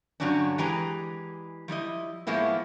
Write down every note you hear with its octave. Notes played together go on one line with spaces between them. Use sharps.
G2 D3 F#3 G3 C#4 D4
E3 G#3 G4 B4 A#5
F3 G3 E4 D#5
A2 F3 G#3 A#3 B3 E4